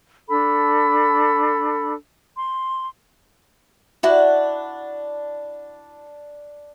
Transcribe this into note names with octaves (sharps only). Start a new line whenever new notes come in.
D4 A4 B5
C6
D4 E4 F#4 F#5